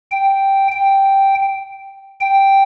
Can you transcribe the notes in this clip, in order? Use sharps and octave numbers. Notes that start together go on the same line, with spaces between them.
G5
G5
G5